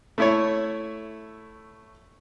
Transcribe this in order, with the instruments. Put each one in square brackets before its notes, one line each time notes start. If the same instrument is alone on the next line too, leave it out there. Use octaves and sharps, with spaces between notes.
[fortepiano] A3 E4 C#5